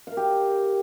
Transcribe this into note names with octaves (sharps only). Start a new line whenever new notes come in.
G4 A#4 F5